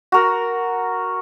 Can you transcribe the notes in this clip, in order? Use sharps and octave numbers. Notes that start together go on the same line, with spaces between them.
F#4 A#4